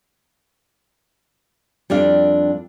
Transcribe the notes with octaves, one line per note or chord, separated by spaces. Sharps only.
F2 G3 D4 F5